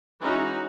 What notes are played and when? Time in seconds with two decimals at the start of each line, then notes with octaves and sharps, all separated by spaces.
0.21 E3 G#3 C#4 D#4 F#4